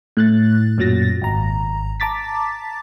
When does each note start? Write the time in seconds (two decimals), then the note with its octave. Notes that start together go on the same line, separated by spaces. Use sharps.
0.17 A2 F#6 A6
0.78 F#2 A#2 F#3 A6 A#6
1.22 G#1 A#5
2.00 A5 A#5 D6 A6 B6